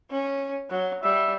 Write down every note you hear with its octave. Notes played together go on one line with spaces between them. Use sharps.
C#4
F#3
G3 E5